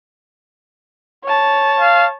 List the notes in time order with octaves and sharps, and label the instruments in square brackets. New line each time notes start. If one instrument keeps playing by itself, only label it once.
[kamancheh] C#5 A5
[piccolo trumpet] F5